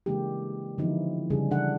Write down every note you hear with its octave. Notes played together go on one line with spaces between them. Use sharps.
C#3 E3 G#3 A#3 D4 G4
D3 E3 F3 B3 D#4 E4
C#3 G3 D4 G#4
C#3 E3 G3 D4 A4 F#5